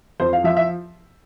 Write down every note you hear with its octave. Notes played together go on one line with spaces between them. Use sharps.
F2 C5
F5
F3 E5
E5